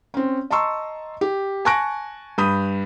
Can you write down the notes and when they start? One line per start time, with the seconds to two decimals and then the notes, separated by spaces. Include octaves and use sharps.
0.14 C4 C#4
0.50 D#5 A5 A#5 C6 C#6 E6
1.21 G4
1.65 G#5 A5 C#6 F#6 A#6 D7
2.38 G2 B5 D#6 G6 D#7